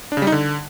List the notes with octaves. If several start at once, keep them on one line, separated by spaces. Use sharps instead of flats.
D4
C#3
G3
D#4
D3